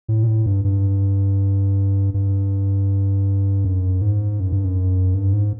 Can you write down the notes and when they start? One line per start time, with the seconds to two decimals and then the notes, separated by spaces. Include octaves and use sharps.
0.08 A2
0.23 A#2
0.27 A2
0.46 G2
0.64 G2
2.14 G2
3.65 F#2
4.01 G#2
4.40 F#2
4.52 G2
4.64 F#2
5.14 G2
5.33 G#2